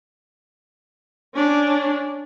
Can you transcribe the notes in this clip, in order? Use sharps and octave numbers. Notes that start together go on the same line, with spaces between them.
C#4 D4